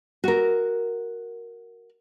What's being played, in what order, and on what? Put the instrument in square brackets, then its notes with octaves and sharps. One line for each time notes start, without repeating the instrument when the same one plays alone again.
[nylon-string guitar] F#4 A#4